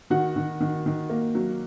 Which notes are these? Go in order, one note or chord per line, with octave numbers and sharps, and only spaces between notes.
D#3 F#4
D#3
D#3
D#3
A#3
F#3